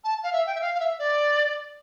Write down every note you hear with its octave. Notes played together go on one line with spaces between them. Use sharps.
A5
F5
E5
G5
E5
F5
F5
E5
D5